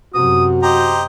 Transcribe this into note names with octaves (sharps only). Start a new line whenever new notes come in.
F#2 C3 F#4 D#6
G4 C5 D#5 A#5